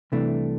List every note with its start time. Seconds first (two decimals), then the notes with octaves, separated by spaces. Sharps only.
0.12 C2 C3 E3 A3 D4